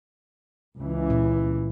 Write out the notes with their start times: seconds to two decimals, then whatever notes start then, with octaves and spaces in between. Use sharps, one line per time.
0.78 C#2 E3
1.10 A#2